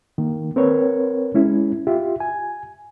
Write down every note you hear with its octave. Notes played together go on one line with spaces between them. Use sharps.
D#3 A#3
C4 A#4 B4 C#5
G#3 C#4 E4
F4 G4 E5
G#5